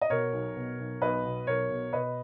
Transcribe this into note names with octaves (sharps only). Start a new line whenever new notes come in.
D#5
B2 A#4 C#5
B1
B2
B1
B1 B4 D#5
B2
B1 A#4 C#5
B2
B2 B4 D#5